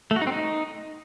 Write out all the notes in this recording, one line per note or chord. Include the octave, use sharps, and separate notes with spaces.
A3
F#4
D#4
C4
D#4